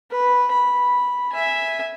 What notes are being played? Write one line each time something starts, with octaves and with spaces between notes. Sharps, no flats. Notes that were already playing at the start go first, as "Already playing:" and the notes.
B4
B5
E5 G#5